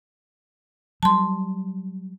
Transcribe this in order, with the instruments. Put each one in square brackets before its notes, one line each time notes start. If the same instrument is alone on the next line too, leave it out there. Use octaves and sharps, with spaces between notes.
[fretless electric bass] F#3 G3 [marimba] A5 C6